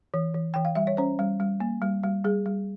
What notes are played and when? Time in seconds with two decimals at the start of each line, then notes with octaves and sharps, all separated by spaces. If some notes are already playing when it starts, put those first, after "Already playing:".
0.14 E3
0.34 E3
0.54 E3 G5
0.65 F5
0.75 G3 E5
0.87 C#5
0.97 C#4 C5
1.19 G3
1.40 G3
1.60 A#3
1.82 G3
2.03 G3
2.25 G3 G#4
2.46 G3